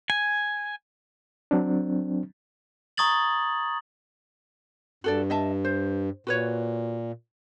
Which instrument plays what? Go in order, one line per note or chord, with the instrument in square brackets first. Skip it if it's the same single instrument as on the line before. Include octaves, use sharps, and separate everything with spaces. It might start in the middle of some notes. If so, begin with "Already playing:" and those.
[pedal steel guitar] G#5
[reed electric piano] F#3 C4 D4
[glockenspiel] A#5 C#6 D#6 G#6 A6 F#7
[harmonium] G2 [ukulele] F#4 A4 D5
[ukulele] D#5 E5 A5
C5
[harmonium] A#2 [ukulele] F#4 B4 C#5